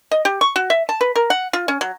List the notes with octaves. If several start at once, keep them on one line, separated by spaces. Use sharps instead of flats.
D#5
G4
C#6
F#4
E5
A5
B4
A#4
F#5
F4
C#4
F#3